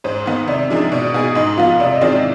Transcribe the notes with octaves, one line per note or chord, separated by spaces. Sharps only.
G#2 C5
D#3 B3 D#4
C3 D5
F3 G#3 D4 D#4 D#5
B2 D5
B3 D#4 G#4
G#2 D#4 D#5
F3 B3 F4 F5
C3 D5
D#5
D#3 G#3 C4 F4 D5